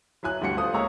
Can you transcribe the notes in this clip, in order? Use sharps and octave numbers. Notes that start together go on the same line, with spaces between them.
F#3 E4 G#5 F#6
G1 D2 G3 F#5 C#7
F4 A4 C5 F#5 C6 D#6
C#2 A#3 G#4 C#5 A#5 E6